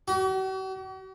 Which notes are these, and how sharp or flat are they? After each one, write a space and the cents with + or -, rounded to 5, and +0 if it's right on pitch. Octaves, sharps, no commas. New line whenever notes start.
F#4 +45